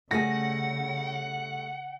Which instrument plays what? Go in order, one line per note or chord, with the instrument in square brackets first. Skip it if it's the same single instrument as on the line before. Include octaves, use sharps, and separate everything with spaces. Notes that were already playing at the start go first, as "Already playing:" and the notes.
[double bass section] C#3 [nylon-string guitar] G3 A3 G#4 [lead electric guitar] F#5 [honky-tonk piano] A#6